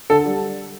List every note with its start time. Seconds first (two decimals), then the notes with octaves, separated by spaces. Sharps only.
0.10 D3 A4
0.25 G3